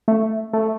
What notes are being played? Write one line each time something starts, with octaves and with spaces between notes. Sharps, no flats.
A3
A3